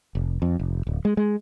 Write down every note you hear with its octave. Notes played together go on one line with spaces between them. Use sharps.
F1
F2
F1
D1
G#3
G#3